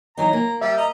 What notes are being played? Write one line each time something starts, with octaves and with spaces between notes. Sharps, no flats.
E3 F#3 D#4 A#5
A#3
G3 E5
D#5 A#5